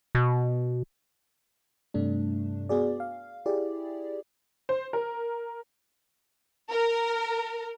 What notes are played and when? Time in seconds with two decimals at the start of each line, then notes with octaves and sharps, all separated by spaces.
0.15 B2
1.94 G2 C3 A3 D4
2.69 B3 F#4 G#4 D5
3.00 F5
3.46 E4 G4 G#4 D5
4.69 C5
4.93 A#4
6.71 A#4